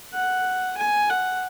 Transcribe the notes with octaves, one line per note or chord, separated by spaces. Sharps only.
F#5
G#5
F#5